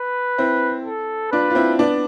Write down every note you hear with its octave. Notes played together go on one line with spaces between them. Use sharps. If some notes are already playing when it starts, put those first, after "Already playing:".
Already playing: B4
C4 E4
A4
D4 F4 B4
F4
C4 E4
B3 D4